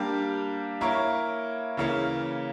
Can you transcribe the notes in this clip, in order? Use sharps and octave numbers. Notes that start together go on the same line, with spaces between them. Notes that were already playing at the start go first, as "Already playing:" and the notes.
Already playing: G3 A#3 D4 G4
A#3 E4 A#4 C#5
C#3 E3 A#3 C#4